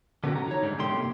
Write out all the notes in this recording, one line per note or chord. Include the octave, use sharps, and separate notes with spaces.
D3 B3 C#4 D4 F#4 G4
A#5
D#4 C#5
G#2 D3 G3
F2 C3 D#3 A3 G4 C6
A#3